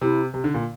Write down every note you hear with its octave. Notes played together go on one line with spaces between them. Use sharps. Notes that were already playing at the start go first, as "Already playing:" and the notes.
C3 E4
C3
D3
A#2